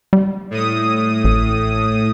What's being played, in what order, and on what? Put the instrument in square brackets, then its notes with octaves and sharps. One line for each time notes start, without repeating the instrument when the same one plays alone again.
[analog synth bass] G3
[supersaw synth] A2 D#6
[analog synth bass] A1